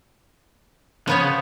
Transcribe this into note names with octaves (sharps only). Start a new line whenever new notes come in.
C#3 F3 B3 C#5